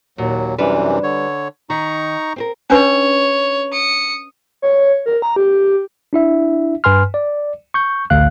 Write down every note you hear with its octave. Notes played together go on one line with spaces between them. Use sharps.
D#2 A#2 F#3
F#2 C3 E3 G3 D4 B4
D3 C#5
D#3 D#4 A#5 C#6
C4 G#4 A#4
C#4 D4 B4 C#5
D#6 C#7
C#5
A#4
A#5
G4
D4 E4 E5
G2 B4 G#5 C6 F6
D5
C#6 G6
A1 D2 F5 F#6